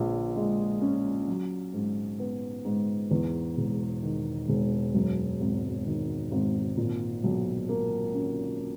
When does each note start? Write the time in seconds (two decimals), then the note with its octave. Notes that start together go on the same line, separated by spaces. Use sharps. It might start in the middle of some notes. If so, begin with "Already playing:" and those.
Already playing: A#1 A#2
0.36 G#3
0.82 C#4
1.28 F#3
1.73 G#2
2.20 B3
2.65 G#2
3.11 E2
3.57 E1
4.03 D#3
4.49 E1
4.94 F#2
5.40 G#1
5.85 D#3
6.32 G#1
6.77 A#2
7.24 B1
7.69 A#3
8.15 C#4